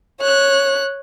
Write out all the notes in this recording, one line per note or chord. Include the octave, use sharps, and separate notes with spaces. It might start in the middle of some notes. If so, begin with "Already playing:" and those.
C#5 F#6